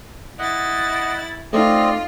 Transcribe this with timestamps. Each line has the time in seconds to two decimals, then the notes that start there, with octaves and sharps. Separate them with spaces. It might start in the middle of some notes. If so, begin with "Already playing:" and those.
0.39 E4 D#5 F#5 A6
1.53 A3 C4 D#4 F4 D5 D#5